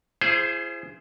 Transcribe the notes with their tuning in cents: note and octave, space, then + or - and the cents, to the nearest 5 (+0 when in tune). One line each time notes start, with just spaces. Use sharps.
E4 +40 G#4 +0 C5 +0